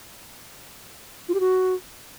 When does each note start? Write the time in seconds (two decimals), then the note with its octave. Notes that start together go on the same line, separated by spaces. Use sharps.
1.29 F4
1.34 G4
1.40 F#4